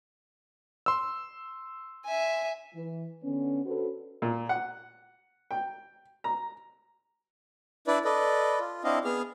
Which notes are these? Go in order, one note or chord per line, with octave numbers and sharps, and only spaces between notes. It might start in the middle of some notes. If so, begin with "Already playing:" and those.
C6 E6
E5 G#5
E3
D3 B3 C#4
C#4 D4 F#4 A4 B4 C5
A#2
F#5
G5
A#5
D4 E4 B4 D5
A4 B4 D5 D#5
F4
C4 D4 E4 D#5 F5
B3 G#4 F6